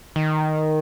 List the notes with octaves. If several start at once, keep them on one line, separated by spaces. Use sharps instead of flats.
D#3